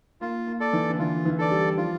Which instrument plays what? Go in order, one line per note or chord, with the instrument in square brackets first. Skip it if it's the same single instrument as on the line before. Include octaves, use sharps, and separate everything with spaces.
[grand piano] A#3 [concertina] F4
[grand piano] A#3
[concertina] A4 D5
[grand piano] E3
D3
[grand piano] E3 [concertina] F4
[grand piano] E3
[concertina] A4 D5
[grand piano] G3
[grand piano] F3 [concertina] F4